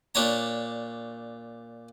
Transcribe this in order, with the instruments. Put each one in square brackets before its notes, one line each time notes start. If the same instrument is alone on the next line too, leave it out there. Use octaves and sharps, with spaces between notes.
[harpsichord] A#2 D4 C#5 A#5